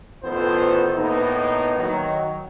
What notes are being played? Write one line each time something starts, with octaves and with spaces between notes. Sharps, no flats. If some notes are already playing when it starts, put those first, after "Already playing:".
A1 D#3 B3 F4 A4 C5
A2 A#3 B3 D#4
D#3 F#3